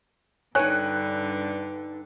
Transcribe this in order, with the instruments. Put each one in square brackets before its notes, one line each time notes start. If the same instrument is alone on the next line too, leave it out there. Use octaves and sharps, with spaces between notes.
[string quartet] G2 D3 [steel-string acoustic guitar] D#4 B4 G5 [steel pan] C#5 G#5 [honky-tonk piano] F#6